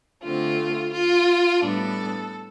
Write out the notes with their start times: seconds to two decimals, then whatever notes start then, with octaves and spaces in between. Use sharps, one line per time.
0.23 D3 A3 C4 F4
0.92 F4
1.60 A2 G3 B3 D4 A4